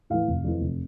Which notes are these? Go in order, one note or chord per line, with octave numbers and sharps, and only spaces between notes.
A2 E3 F5
F1
F2 E3
F1